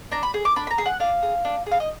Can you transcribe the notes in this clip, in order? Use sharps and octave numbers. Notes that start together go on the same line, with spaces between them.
D4 A#5
B5
G#4
D6
D4 B5
B5
A#5
G#4
F#5
D4 F5
G#4
D4
G#4 F5
D#5